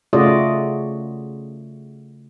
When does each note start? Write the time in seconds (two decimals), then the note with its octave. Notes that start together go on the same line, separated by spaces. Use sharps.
0.13 C#3 A3 F4 F#4 D5 D#5